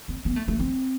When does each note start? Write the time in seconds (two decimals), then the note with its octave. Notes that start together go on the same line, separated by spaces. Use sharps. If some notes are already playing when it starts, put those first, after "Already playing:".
0.08 C4
0.25 B3
0.36 A3
0.48 A3
0.59 C4